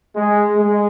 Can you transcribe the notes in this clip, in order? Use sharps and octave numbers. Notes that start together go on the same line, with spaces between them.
G#3
G#3